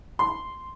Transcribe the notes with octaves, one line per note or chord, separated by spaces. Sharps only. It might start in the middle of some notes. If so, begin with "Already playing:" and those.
C6